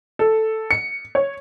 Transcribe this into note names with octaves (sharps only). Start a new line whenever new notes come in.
A4
C#7
C#5